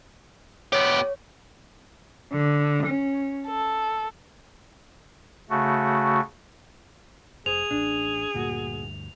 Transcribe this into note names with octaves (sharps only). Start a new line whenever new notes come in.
B3 G4 C#5
D3
C#4
A4
C#3 A3 F#4
F1 G#4 C5 F7
A1 D4
D2 G2 A#2 F#4